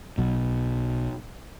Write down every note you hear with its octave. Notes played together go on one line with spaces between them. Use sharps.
B1 B2